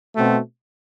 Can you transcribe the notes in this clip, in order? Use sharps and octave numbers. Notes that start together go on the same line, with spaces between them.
B2 A3 C4 F#4